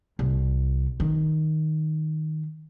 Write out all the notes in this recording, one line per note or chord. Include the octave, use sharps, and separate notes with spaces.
C2
D#3